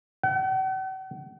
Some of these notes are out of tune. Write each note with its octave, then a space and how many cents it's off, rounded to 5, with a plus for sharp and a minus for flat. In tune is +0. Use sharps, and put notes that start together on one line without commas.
F#5 +45